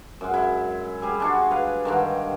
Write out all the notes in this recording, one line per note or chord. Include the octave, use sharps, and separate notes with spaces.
F#2 G#3
E4
G3 G#4
G#3 D4 F#4
B4 F5
G2 D3 D#3